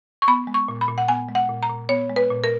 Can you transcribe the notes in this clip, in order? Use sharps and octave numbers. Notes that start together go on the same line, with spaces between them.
C#6
B3 B5
G#3
C#6
A#2
B5
A#2
F#5
B3 G#5
G#3
F#5
A#2
A#5
A#2
B3 C#5
G#3
B4
A#2
A#4